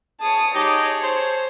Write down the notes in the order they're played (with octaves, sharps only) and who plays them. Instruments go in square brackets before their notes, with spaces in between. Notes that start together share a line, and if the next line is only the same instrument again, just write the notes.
[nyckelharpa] G#4 C#5 [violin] A5 D#6
[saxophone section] D#4 G4 [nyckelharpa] G#4 A5 [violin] C#5
[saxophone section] C5